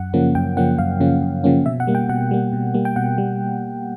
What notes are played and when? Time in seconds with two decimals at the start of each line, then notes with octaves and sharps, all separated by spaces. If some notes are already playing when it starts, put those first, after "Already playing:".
Already playing: F#2 F#5
0.14 C#3 F3 A#3 C#4
0.35 F#2 G5
0.57 C#3 F3 A#3 C#4 F#5
0.79 F#2 F5
1.00 C#3 F3 A#3 C#4
1.22 F#2
1.44 C#3 F3 A#3 C#4
1.66 B2 E5
1.80 F#5
1.87 G3 A#3
1.95 G5
2.09 B2 F#5
2.31 G3 A#3
2.53 B2
2.74 G3 A#3
2.85 G5
2.96 B2 F#5
3.18 G3